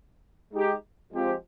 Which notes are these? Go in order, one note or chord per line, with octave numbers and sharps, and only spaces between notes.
G#3 D#4 G4
F3 G#3 C4 G4